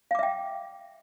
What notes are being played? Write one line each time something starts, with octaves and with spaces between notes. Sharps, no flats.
E5 F5 G5 D6